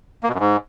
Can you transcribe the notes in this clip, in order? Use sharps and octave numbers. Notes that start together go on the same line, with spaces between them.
A#3
B2
F#2
G#2